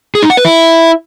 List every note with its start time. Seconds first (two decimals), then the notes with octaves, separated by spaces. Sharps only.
0.15 G#4
0.22 D#4
0.30 F#5
0.37 B4
0.45 E4